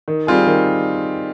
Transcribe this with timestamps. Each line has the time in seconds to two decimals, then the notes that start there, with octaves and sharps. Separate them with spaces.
0.08 D#3
0.27 G3 C4 F4 G#4
0.46 D#3